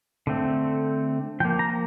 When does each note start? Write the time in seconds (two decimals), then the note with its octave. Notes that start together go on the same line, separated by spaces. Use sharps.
0.27 D3 A3 C4
1.40 F3 G5
1.45 A#3
1.59 A#5